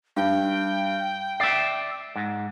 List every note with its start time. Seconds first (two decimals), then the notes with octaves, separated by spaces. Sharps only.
0.16 G2 G5
1.40 D5 E5 C7
2.16 G#2